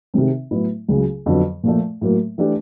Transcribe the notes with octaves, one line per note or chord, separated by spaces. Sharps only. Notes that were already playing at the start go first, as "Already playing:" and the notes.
C3 D#3 G#3 C4
A2 F#3 B3 E4
C#2 C#3 F#3
F2 D3 F#3 B3
A#2 F3 A3
A2 F#3 A#3
E3 A3 D4 G4